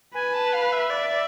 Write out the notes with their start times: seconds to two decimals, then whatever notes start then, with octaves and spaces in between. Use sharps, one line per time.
0.14 B4 G#5
0.33 A5
0.53 F5
0.72 E5
0.91 D5